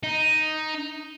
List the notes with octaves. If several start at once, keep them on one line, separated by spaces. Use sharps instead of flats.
D#4